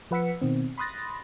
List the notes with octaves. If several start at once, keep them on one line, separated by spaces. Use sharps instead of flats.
F3 B4 F#5 E6 B6 C#7
B2 D#3 C4
B5 C6 D#6 F#6 A6 A#6